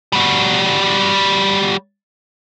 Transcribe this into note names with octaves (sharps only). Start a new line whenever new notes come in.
G3 F#4